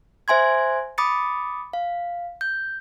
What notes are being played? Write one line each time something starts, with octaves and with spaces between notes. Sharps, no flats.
C5 E5 G#5 C6 G#6
B5 D6 D#6 A6 C#7
F5
G6